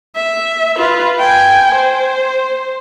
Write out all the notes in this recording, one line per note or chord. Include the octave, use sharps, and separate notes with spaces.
E5
F4 B4
G5 G#5
C5